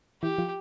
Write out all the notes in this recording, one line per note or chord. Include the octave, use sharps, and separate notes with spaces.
E3 E4 G4
F3 F4